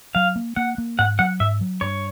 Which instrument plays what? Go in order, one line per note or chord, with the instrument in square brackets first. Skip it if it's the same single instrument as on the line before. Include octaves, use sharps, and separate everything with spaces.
[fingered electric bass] F#3 [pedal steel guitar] F5
[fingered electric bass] A#3
[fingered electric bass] A#3 [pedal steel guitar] F#5
[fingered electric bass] A#3
[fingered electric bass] G#2 [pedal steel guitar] F#5
[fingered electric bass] F#3 [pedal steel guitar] F#5
[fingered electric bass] G#2 [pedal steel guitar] E5
[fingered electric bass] F#3
[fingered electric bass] G2 [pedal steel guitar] C#5